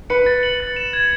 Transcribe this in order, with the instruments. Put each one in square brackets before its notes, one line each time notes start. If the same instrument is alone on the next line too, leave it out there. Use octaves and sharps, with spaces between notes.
[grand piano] B4 [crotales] C#7
[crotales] A6
F#7
A6
E7
G#6